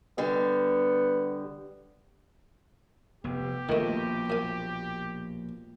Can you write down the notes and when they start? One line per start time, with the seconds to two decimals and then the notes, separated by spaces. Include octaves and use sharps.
0.18 D3 G3 B3
3.24 F1 B3 G4
3.69 A#1 B2 D#3 A3 A#3 F4
4.30 F#2 G#5